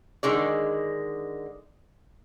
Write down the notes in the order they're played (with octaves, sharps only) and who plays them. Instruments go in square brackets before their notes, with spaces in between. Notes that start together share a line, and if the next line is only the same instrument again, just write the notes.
[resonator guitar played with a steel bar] D3 D#3 G#3 D5